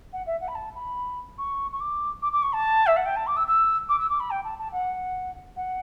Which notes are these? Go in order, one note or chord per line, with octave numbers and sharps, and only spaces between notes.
F#5
E5
F#5
B5
A5
B5
C#6
C#6
D6
D6
D6
C#6
A5
E5
F#5
G5
A5
D6
E6
E6
D6
E6
D6
B5
G5
A5
A5
F#5
F#5